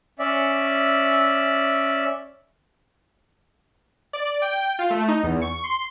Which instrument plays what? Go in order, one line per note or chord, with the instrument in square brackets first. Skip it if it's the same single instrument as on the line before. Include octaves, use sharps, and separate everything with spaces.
[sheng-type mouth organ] C#4 D5 E5
[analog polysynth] D5
G5
F4
A3
D#4
E2
C#6
C6